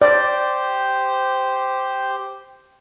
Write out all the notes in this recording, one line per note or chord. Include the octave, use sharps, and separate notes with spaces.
G4 C5 D5